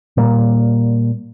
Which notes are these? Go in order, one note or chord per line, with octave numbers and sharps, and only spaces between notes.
A#2 G3 A#3